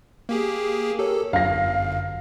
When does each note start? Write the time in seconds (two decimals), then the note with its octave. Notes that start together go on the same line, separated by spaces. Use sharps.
0.29 A#3 G4 G#4
0.99 G4 A4 A#4 C#5
1.33 G1 F#2 F5 A#6